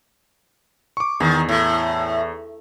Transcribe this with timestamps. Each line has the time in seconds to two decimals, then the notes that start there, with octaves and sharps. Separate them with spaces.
0.97 C#6 D6
1.20 E2 D#3
1.49 A2